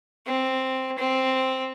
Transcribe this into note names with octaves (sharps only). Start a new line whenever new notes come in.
C4
C4